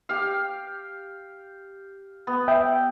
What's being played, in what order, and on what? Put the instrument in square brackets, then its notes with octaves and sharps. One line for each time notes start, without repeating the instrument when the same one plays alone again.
[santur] G4 F5
B3
[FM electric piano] E5 G5